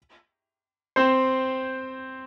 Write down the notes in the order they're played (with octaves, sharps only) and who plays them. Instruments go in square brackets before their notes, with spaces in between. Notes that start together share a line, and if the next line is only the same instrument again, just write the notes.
[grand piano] C4 C5